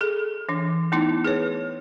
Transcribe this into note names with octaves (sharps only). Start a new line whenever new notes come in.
G#4 A4
E3 D4
A3 B3 D#4 E4
G#4 B4 C#5